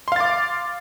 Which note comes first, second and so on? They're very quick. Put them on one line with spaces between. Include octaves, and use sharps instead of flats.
C6 F5 A6 D6